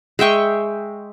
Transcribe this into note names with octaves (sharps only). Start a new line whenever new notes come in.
G#3 E5 G5 C#6